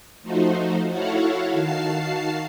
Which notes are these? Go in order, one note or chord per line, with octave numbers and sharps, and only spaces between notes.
F3 A3 D#4 F#4 C5
E4 F#4 A4 C#5 F5 F#5
D#3 F#4 F5 A5 C7